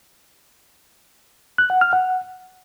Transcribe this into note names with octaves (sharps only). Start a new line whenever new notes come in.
F#6
F#5
F6
F#5